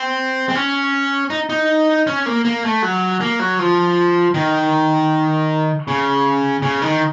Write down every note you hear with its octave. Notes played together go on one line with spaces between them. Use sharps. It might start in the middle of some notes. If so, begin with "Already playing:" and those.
Already playing: C4
C4
C#4
D#4
D#4
C#4
A#3
A#3
A3
F#3
A#3
F#3
F3
D#3
C#3
C#3
D#3